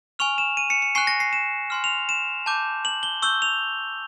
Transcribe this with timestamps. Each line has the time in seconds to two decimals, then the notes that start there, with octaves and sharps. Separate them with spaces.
0.19 G#5 C#6 F6 F7
0.38 E7
0.57 D#7
0.70 C#7
0.82 C#7
0.95 G#5 C#6 F#6 C7
1.07 A#6
1.20 C7
1.33 E7
1.70 G#5 C6 F6
1.84 F7
2.09 E7
2.46 A5 D6 G6
2.85 F#7
3.03 G7
3.22 C#6 E6 G6 G7
3.42 F7